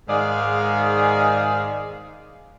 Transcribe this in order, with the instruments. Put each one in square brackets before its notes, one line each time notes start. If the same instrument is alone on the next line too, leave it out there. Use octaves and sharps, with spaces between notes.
[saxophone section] G#2 D#3 G#3 G#4 D5 F5